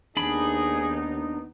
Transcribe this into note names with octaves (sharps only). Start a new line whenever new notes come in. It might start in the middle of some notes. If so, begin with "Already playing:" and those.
D#2 B3 D4 D#4 G#4 B5